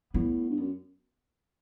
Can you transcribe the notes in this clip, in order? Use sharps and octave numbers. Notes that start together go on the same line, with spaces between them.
A2 B3
G2
F#2